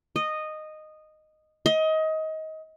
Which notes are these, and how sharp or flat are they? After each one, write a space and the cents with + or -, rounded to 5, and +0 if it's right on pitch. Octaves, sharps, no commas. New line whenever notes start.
D#5 -10
D#5 +25